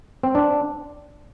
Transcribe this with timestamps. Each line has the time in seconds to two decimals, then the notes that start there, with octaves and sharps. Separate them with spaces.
0.23 C4
0.35 D4